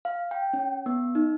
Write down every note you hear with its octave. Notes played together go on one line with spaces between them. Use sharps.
F5
G5
C#4
B3
D#4